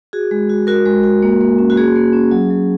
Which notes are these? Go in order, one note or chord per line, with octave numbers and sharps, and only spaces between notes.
F#4 G#4
G#3
F#4
F#4 A#4
G#3
F#4
A#3
A#3
C#4
F#4
A#3 G#4
A#3
C#4
F#3
F#3